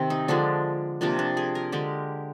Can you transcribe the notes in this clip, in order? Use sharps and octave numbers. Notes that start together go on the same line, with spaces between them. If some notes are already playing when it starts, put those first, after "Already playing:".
Already playing: C3 D#3 C4
D#4
D3 F3 G#3 D4
C3 F3 A#3 D4
D4
G#4
A#4
D3 G#3 G4